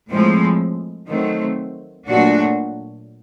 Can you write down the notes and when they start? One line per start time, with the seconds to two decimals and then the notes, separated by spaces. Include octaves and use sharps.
0.10 A2 F3 G#3 C4
1.08 D#3 F#3 A3 C4
2.07 A#2 F#3 A3 D4 F#4